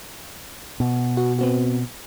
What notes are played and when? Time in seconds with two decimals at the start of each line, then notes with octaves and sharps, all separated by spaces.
0.80 B2
1.17 F#4
1.39 B3 C4 F#4